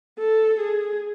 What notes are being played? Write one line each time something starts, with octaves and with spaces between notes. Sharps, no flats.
A4
G#4